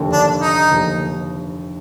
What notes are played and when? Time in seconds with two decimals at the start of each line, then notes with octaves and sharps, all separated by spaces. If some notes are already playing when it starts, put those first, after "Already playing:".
Already playing: F1 D#2 D3
0.13 D4
0.41 D#4
0.70 F1 D#2 D3